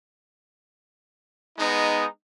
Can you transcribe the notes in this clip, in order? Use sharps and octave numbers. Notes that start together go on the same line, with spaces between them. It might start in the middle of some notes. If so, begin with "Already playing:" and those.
G#3 B3 D#4